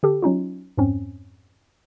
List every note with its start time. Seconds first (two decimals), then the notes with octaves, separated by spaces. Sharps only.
0.03 D3 G4 A4
0.23 F#3 C#4 D#4 F4
0.77 F2 G#2 C4 C#4